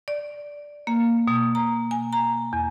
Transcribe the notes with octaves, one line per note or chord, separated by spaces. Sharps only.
D5
A#3
B2
A#5
G#5
A#5
E2